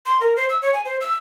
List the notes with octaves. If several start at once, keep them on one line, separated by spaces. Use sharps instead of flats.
C6
A#4
C5
E6
C#5
G#5
C5
E6